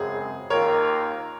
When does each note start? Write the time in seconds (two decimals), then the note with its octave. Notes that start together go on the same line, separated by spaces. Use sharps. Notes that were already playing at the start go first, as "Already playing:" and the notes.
Already playing: F#2 C#3 G#3 C4 G#4
0.50 D#2 D#3 A#3 F4 A#4 C#5